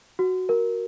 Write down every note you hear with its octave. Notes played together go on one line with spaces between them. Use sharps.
F#4
A#4